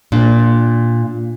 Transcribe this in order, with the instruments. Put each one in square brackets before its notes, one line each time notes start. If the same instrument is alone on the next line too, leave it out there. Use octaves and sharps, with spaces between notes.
[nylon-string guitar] A#2 D4